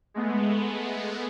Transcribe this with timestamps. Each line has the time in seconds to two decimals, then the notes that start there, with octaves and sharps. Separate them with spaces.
0.14 G#3 A3 B3